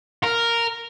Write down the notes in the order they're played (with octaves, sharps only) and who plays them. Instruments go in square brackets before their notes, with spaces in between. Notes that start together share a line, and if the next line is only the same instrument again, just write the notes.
[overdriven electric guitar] A#4